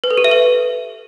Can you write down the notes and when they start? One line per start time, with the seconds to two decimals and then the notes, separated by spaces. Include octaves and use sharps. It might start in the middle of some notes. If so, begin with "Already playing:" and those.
0.04 B4
0.11 A4
0.17 G4
0.24 E5
0.31 B4